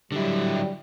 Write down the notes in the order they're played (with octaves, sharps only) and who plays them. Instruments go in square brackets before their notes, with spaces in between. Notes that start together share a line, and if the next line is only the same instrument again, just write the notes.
[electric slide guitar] D3 E4 [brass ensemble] F#3 G3